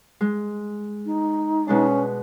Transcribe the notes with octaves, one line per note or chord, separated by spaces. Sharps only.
G#3
D#4
B2 G#3 C#4 D4